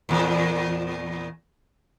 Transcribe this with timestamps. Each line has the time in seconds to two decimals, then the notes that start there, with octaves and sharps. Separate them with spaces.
0.09 E2 A#2